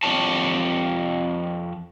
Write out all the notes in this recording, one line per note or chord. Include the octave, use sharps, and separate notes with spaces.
F2 G4 C#5 A5